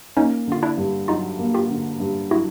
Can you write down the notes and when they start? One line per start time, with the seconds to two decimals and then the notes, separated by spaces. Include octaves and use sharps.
0.17 A#3 C#4 D#4
0.47 D3 F4
0.63 D4 E4
0.77 G2
1.08 F#3 D#4 F4
1.39 A#3
1.54 F4 G4
1.69 D3
2.00 G2
2.31 F#3 E4 F#4